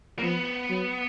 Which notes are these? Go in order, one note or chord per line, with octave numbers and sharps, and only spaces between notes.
A#3
F3 B3
F#3